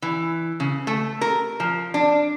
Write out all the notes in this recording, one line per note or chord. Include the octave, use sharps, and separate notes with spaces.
E3
C#3
A3
A#4
F3
D4